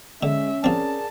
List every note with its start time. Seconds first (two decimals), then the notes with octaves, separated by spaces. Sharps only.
0.23 D3 G#3 C#4 E5
0.64 F3 C4 G#4 A#4 D5 A5